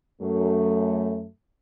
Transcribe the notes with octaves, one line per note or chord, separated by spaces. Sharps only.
F#2 A3